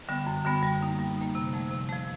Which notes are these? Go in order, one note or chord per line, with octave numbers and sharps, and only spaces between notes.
D3 G3 B3
F#2
D3 G3 B3
G3
A#3 D#4
G3
A#3 D#4
C3
F3 A3
C3
F3 A3